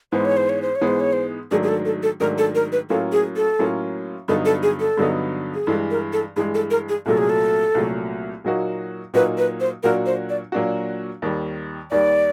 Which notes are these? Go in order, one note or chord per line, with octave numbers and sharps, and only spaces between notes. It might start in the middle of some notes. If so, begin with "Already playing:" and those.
G#2 E3 G#3 B3 C5
C#5
C5
C#5
C5
C#5
G#2 E3 G#3 B3
C5
C#5
C5
G#2 D#3 F#3 A3 D4 G#4
G#4
A4
A4
A4
G#2 D#3 F#3 A3 D4 A#4
A4
A#4
B4
A2 F#3 A#3 C#4 F4 A4
G#4
A4
A2 F#3 A#3 C#4 F4
G2 D3 F#3 B3 D#4 A4
A4
G#4
A4
G2 D3 F#3 B3 D#4
G#4
G2 E3 G#3 A4
A#4
A4
G2 E3 G#3 G#4
A4
A#4
G#4
C2 A#2 F#3 A3 A4
G#4
A4
C2 A#2 F#3 A3
A#2 F#3 A#3 D#4 F#4
A#2 F#3 A#3 D#4 F#4 B4
B4
C5
A#2 F#3 A#3 D4 F#4 A#4
C5
D5
A#2 F#3 A#3 D4 F#4
D#2 D#3 G3
D#2 D#3 G3 D5